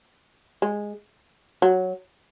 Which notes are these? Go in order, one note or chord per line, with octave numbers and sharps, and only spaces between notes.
G#3
F#3